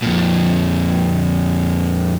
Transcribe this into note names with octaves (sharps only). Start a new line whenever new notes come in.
F2 A#2